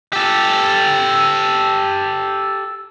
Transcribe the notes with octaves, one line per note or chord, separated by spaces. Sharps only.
G4 A4